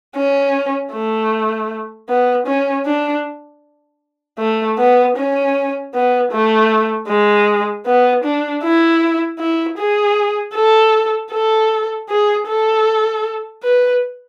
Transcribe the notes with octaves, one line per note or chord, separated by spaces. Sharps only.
C#4
A3
B3
C#4
D4
A3
B3
C#4
B3
A3
G#3
B3
D4
E4
E4
G#4
A4
A4
G#4
A4
B4